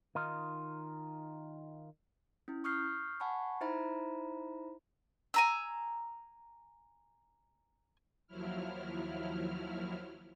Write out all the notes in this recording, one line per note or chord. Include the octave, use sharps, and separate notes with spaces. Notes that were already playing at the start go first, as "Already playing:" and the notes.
D#3 D#4 F4
C#4 E4
C#6 D#6 F6 G6 C7
F#5 G#5 A5 B5 C#6
D#4 E4 C5 E5 A#5 B5
G#5 A#5 E6
D#2 F3 F#3 E4 F6